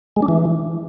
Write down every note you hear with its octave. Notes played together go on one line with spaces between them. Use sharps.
G#3
D4
E3